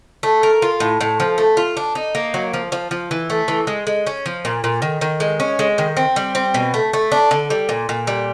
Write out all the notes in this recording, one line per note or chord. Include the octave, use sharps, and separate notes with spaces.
A3
A#4
F4
A2
A2
F3
A3
F4
D4
D#4
A#3
F#3
F3
F3
F3
E3
A3
E3
G#3
G#3
C#4
F3
A#2
A#2
D#3
D#3
G#3
C#4
G#3
D#3
C4
G3
C4
B2
A3
A3
D4
D3
G3
A#2
A#2
G3